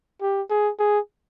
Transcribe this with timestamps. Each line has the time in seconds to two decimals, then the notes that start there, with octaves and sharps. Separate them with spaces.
0.21 G4
0.50 G#4
0.79 G#4